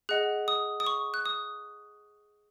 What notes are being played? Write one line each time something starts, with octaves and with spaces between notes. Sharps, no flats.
G#4 D#5 F#5 F#6
D#6
D#6
C#6
F#6
D#6